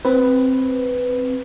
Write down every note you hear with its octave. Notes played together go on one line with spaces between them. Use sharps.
C4 B4